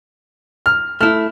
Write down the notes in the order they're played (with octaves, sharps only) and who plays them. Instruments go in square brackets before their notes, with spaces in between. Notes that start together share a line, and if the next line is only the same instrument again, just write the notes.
[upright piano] F6
[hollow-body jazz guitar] A3 E4 [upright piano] F6